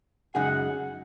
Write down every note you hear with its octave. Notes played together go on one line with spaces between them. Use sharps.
F#2 C#3 G#3 D#4 G#4 F#5